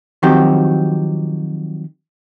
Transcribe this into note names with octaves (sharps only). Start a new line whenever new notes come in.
D#3 F3 F#3 C4 F#4 G4